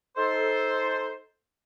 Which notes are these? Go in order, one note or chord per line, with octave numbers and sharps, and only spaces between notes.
D#4 A4 C5